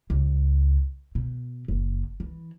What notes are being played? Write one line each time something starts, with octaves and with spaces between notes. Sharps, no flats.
C#2
B2
F#1
E3